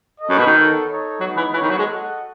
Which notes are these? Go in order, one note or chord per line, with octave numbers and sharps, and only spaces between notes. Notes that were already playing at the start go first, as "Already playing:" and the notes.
F#4 A4 D#5
F#2
B2
D#3
B3 D#4 A4 C#5
D#4 A4 C#5
F#3 G#3 B3 D#4
E3
E3 B3 F#4 A4 C#5
D#3
F#3
G#3
F#4 A4 D#5 F#5